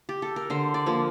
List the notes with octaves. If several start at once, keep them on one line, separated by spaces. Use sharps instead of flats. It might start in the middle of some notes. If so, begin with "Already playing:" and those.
G4
A4
A#4
D3 C5
D5
F3 A#3